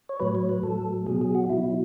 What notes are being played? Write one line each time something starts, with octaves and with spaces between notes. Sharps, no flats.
C#5
A2 F#3 B4
C#5
B4
A2 F#3 A4
B2 F#3 G#4
G#4
F#4
B2 F#3 E4
E4